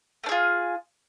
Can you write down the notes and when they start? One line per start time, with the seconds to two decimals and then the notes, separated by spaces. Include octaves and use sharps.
0.24 A3
0.26 D4
0.29 G#4
0.31 F4